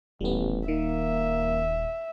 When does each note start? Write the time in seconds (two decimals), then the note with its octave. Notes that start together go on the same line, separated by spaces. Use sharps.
0.21 D#1 A1 G3 B3
0.68 D#3 A#3 E5